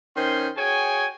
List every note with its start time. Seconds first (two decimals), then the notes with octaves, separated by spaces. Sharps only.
0.16 D#3 C#4 C5 C6
0.57 F#4 G#4 C#5 G5 G#5